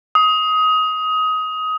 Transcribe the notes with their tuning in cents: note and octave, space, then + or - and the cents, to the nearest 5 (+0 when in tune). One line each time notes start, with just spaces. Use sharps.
D#6 +20